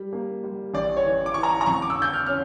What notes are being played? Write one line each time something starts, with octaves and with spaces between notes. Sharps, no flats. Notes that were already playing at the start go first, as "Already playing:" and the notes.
Already playing: G3
A#3
G3
A1 D5
C#5
E3
D6
E3 C#6
A#5
A#5
F2 C#6
D6
E6
D3 G6
F6
C#4 F6